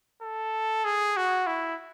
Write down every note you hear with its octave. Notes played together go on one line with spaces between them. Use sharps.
A4
G#4
F#4
E4